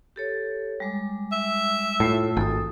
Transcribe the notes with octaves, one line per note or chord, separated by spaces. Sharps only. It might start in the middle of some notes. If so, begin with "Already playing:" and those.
G4 A4 C#5
G3 G#3 D6
E5
A2 A3 F4
G#1 A4 D#6